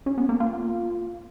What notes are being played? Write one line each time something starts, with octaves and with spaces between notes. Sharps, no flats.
C#4
B3
A#3
F4